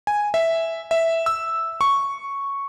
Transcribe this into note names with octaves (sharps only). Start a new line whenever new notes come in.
G#5
E5
E5
E6
C#6